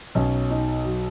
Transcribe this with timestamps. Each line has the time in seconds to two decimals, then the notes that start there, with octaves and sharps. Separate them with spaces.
0.15 B1 B2 C#4
0.50 D#4
0.85 F#3